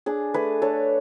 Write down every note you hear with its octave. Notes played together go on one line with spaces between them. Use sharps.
D4 G#4
A3 G#4 B4
D4 A4 C#5